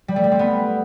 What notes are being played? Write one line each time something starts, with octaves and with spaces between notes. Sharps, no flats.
G3
A3
G3
C4
B3